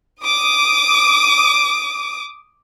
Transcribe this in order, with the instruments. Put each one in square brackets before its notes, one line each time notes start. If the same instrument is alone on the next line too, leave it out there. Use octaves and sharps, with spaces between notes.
[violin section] D6 D#6